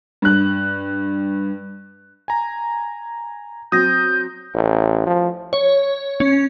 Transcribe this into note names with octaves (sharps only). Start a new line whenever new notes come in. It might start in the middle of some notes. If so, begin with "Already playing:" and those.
G2 F#6
G#5 A#5
F#3 C4 D#6 G6 A#6
A1
F3
C#5
C#4